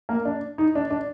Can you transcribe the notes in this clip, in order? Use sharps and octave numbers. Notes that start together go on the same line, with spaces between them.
A#3
D4
D#4
D4
D4